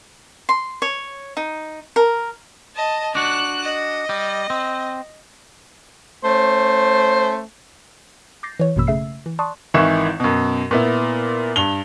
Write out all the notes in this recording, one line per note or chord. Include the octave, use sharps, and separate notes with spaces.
C6
C#5
D#4
A#4
D#5 A5
D4 F#4 F#6
D#5
G3
C4
A3 C#4 C5
D6 G6 A6 A#6 C7
E3 C#5
A1 F#2 B2 A#3 B5 E6
C#3 A3 E5 E6 C7
E3
D5 A5 C6 C#6 D#6 F#6
G#1 D#3 E3 E4 C#6 E7
F#2 B2
A#2 B3 E4
G2 F7 G7